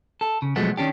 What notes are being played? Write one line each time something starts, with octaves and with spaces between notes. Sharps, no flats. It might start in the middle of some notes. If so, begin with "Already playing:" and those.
A4
C#3
B2 F3 F#3 G#3 A3 B3
D#3 C#4 D4 G4